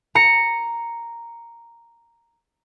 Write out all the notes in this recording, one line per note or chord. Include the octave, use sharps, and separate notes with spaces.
A#5 C#7